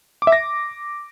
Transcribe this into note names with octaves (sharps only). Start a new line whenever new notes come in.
D6
E5
A#6